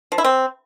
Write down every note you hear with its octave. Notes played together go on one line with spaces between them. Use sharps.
F3
E4
C4